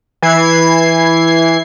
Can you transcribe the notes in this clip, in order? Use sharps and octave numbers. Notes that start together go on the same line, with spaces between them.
E3 E4 G#6 C7